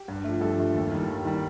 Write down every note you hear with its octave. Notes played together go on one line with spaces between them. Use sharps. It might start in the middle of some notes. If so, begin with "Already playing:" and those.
Already playing: G4
G2
F3 A3
G2 A4
F3 A3
D#2
D#3 G3
D#2
D#3 G3